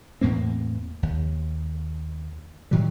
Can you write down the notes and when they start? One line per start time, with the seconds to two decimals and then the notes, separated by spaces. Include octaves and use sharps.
0.21 E2 A2 A#3 C4
1.03 D#2
2.71 A2 D#3 F#3 G3